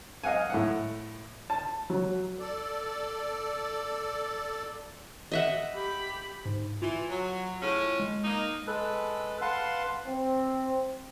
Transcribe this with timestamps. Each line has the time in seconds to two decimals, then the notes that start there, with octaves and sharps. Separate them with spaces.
0.24 D#5 F5 F#5 G#5
0.50 A2 F#5
1.50 A5
1.90 F#3
2.39 A4 D5
5.32 D#5 E5 F#5
5.73 G4 B5
6.46 G#2
6.82 E3 F4
7.09 F#3
7.62 A2 C#4
8.00 G#3
8.24 A#3 D#4
8.67 G#3 A4 B4
9.41 B4 F5 F#5 A5 C6
10.05 C4